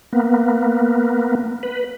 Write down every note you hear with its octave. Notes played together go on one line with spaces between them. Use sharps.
A#3 B3
B4